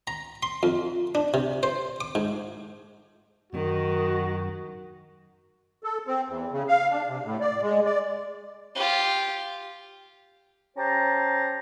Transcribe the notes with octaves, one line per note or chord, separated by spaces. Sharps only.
A#5
C6
F2
D4
C3
C5
D6
G#2
F#2 D#3 F#4
A4
C4
E2
C#3
F5
D4
C3
A2
D5
G#3
D5
F4 G4
C#4 G4 C5 A5 A#5